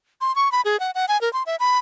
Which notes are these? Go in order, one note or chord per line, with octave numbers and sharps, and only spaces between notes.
C6
C#6
B5
G#4
F#5
F#5
G#5
A#4
C6
E5
B5